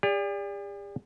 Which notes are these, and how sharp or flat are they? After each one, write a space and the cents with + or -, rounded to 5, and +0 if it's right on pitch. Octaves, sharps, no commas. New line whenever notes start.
G4 +45 D5 -15